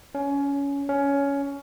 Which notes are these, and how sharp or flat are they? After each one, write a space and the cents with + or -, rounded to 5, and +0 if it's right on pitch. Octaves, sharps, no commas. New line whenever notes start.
C#4 +20
C#4 +15